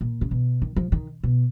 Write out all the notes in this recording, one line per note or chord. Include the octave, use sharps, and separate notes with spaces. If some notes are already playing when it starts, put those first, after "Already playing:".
A#2
C#3
B2
D#3
F3
D#3
B2